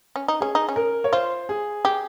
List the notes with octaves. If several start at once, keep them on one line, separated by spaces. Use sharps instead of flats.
C#4
D#4
C#4 G#4
D#4
C#4
A#4
C#5
F4 C5
G#4
G4 G#4